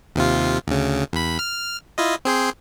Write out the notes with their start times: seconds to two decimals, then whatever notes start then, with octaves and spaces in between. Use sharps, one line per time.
0.16 D#2 C3 F4
0.67 D2 C#3
1.13 E2 B5
1.39 F6
1.98 E4 F4 D#5
2.25 C4 G#4 C5